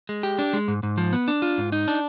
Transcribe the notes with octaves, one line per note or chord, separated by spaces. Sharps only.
G#3
G4
D4
G#3
G#2
G#2
F3
B3
D4
F4
G#2
D#4
D4